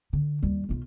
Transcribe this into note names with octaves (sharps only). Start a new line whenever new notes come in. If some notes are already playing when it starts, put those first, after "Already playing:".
D3
D#2 G3
B1 F4